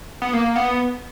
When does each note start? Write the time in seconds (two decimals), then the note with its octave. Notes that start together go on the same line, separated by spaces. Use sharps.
0.22 B3
0.33 A#3
0.56 B3